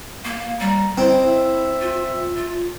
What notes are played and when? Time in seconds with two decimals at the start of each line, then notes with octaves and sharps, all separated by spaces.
0.25 A#3
0.60 G3 A#5
0.98 C4 E4 D#5
1.27 E5
1.81 F4
2.36 F4